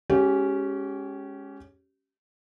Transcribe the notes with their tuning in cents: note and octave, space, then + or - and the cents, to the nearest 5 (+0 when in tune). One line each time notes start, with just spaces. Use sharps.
G#3 +0 C#4 +0 G4 -30